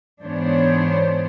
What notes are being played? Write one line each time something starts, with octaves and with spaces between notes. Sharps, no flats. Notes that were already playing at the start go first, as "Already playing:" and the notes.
G#2 E3 B3 D4 C5 C#5